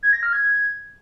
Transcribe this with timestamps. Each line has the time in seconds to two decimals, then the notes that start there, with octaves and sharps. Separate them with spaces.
0.03 G#6
0.13 A#6
0.23 F6
0.33 G#6